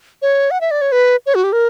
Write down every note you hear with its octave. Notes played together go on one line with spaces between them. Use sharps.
C#5
F#5
E5
D5
C#5
B4
C#5
F#4
G4
A#4